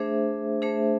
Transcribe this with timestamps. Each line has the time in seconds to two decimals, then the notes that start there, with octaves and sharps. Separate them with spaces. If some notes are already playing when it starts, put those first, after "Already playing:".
Already playing: A3 D4 G#4 C5 E5
0.62 A3 D4 G#4 C5 E5